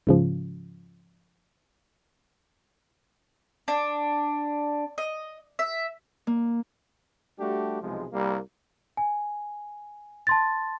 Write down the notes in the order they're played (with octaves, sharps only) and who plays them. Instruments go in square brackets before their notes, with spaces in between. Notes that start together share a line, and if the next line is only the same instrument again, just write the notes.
[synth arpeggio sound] G#2 C#3 F3
[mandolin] D4
D#5
E5
[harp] A#3
[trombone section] G3 A3 D4 F#4 G4
B1 C3 F3 G#3
C2 G3 A#3
[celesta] G#5
A5 C6 A6